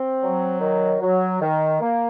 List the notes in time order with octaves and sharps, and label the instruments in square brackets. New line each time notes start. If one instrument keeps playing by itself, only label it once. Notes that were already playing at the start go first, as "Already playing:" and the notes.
Already playing: [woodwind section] C4
F#3
D#3
F#3
D#3
A#3